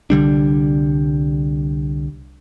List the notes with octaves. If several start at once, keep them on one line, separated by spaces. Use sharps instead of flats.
C2 D3 G3 D4